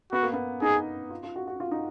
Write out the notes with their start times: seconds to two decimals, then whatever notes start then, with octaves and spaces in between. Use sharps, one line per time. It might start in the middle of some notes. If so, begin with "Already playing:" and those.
0.13 B3 F#4
0.23 A#3
0.33 B3
0.62 D#4 G#4
1.10 F4
1.23 F4
1.36 F#4
1.47 F#4
1.60 F4
1.71 D#4